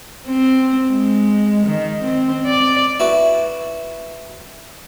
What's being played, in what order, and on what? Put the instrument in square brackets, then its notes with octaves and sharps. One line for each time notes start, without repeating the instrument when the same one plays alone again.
[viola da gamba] C4
G#3
D#3
C4
D5
[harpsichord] E4 F#4 B4